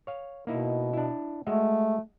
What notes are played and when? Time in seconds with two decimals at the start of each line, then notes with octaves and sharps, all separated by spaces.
0.07 C#5 F5
0.47 B2 A#3 D#4 E4
0.93 D4 E4
1.47 G#3 A3 F#4 E5